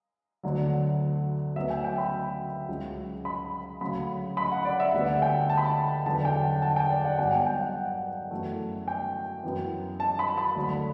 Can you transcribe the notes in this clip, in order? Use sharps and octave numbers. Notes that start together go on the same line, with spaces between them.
D2 D3 F#3
D2 C#3 F#3 B3 E5
G5
G5
B5
C#2 C#3 F#3
B5
D2 C#3 F#3 B5
B5
F#5
D5
E5
D2 D3 G3 B3 F#5
G5
A5
B5
A5
E2 D3 F#3 B3 A5
G5
F#5
A5
G5
D5
F#5
G1 G2 F#3 G5
G5
G5
F#5
F#2 E3 A3
G5
F#2 E3 B3
A5
B5
B5
D2 D3 F#3